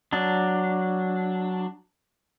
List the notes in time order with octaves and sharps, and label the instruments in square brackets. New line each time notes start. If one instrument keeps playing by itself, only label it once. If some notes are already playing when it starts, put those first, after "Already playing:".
[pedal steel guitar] F#3 D4